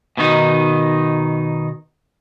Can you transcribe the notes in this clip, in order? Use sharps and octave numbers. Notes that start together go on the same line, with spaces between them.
B2 D#3 D#4